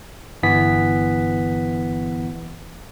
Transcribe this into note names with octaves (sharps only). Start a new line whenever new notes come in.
G1 E3 B3 B6